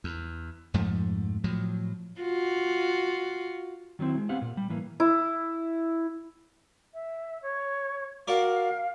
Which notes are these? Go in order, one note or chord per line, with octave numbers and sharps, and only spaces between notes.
E2
F2 G#2 F3 A3
A2 F3 F#3
F4 F#4
D#3 F#3 B3 C4 E4
G#3
B3 C4 G4 F5 F#5
A#2
G3
A2 E3 A#3
E4
E5
C#5
F#4 A#4 D5 F5